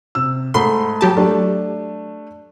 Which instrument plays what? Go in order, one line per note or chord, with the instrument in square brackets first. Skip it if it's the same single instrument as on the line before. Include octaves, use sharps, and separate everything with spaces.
[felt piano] C3 E6
[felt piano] G#2 A3 B5 [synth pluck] C6
[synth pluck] F#3 G4 A5
[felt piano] A3 D4